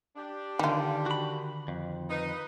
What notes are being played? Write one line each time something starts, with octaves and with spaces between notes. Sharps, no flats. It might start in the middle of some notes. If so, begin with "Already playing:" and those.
D4 G4
D3 D#3 G3 F4
F#4 B5
F2
D#4 B4